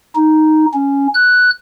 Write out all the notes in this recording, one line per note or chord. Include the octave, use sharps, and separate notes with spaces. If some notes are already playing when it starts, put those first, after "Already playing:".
D#4
C#4
F#6